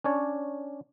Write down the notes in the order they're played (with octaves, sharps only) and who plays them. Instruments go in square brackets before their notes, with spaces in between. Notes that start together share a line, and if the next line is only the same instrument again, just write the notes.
[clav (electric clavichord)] C#4 D4 C#5 D5